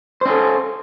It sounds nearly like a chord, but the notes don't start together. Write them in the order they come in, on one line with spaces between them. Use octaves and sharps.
C5 C#4 A4